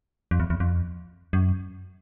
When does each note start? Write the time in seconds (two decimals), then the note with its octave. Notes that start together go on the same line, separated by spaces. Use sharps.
0.31 F2
0.40 E2
0.50 E2
0.60 F2
1.33 F#2